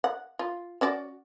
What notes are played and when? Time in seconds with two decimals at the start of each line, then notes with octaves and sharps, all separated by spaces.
0.04 F#5
0.39 F4
0.81 C#4 F#4 D5